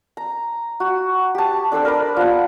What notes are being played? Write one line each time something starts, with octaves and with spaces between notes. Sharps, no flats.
A#5
F#4
G4 A5
D4 A4 C5 E6
A#4 B4 D5
F3 B3 F#5